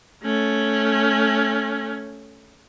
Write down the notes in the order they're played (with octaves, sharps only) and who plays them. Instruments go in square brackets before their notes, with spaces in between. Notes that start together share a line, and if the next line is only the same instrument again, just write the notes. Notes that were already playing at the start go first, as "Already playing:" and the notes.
[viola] A3 C#4